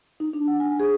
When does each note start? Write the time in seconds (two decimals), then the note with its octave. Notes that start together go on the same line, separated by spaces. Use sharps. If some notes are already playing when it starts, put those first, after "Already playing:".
0.20 D#4
0.33 D4
0.48 F#5
0.60 G#5
0.80 G#4